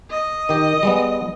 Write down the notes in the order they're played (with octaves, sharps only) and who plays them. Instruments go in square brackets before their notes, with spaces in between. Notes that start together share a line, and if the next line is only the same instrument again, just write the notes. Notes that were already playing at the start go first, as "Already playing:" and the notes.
[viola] D#5
[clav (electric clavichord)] D#3 G4
G3 G#3 B3